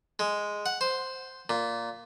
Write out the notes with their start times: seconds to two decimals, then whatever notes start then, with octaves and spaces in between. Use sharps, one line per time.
0.19 G#3
0.66 F#5
0.81 C5
1.49 A#2